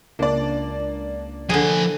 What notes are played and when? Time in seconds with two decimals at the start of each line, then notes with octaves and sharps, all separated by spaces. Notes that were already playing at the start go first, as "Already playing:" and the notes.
0.19 C#2 A#3 D4 D5
1.50 D3 F3 G#4 G#5